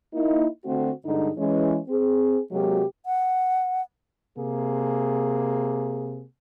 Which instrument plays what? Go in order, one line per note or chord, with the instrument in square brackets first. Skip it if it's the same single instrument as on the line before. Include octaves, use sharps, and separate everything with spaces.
[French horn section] A#3 D#4 E4
D3 A3 C4 F#4
G2 D3 G#3 D#4
E3 G#3 C#4
C4 G#4
C3 F#3 G#3 A#3 F#4 G4
[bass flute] F#5
[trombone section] C3 A#3 G#4